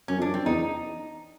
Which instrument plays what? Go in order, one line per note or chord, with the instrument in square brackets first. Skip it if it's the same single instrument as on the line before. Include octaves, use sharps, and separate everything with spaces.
[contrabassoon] F#2 [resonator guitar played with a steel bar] C#4
[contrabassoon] F2 [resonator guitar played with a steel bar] D4
[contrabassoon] F#2
[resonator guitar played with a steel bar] C4
[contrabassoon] E2 [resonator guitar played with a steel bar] D#4